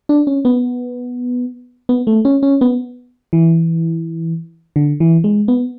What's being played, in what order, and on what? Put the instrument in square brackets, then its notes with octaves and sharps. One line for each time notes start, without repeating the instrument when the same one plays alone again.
[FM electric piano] D4
C#4
B3
B3
A3
C#4
C#4
B3
E3
D3
E3
G#3
B3